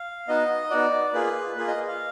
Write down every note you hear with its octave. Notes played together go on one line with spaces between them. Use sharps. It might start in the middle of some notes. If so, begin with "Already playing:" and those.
Already playing: F5
B3 D#4 F#4 D#5
B3 D#4 F#4 D5
A#3 F4 G#4 B4
A#3 F4 G#4 B4
D#5
F5